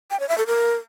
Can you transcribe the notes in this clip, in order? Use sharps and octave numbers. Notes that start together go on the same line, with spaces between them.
G5
C#5
E5
A4
A#4